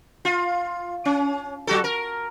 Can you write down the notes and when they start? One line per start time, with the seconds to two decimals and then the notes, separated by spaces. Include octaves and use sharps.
0.25 F4
1.05 C#4
1.67 F#3 F#4 A4
1.84 A#4